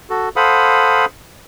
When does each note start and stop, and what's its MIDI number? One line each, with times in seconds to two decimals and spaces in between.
0.10 0.29 66
0.10 0.29 69
0.36 1.06 69
0.36 1.06 72
0.36 1.06 77
0.36 1.06 78
0.36 1.06 83
0.36 1.06 87